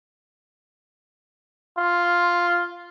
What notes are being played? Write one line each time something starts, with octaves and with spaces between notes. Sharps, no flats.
F4